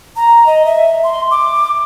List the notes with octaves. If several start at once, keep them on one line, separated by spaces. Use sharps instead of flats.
A#5
D#5
E5
C6
D6